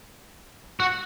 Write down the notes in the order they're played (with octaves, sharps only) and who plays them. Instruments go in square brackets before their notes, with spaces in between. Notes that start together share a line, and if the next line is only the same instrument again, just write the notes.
[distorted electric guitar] F#4